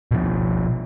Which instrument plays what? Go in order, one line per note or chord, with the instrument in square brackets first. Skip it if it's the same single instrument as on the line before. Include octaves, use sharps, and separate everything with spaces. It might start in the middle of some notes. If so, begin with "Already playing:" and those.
[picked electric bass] B2 F3